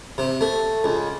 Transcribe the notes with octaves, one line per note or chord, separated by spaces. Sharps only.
C3
A3
C#2